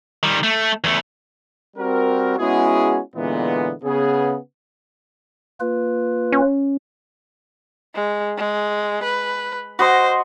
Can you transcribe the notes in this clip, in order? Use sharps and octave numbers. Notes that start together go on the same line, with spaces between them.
D#3 G3
A3
E2 A3
G3 C4 F#4 A#4
G#3 B3 C#4 E4 F#4 G#4
A#2 D3 E3 G#3 B3
C#3 B3 G#4
A#3 F4 B4
C#4
G#3
G#3
B4
F#4 C5 D#5 C6